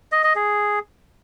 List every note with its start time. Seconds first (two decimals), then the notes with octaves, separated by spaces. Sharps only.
0.12 D#5
0.24 D#5
0.35 G#4